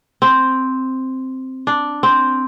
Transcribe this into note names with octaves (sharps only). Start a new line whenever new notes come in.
C4
D4
C4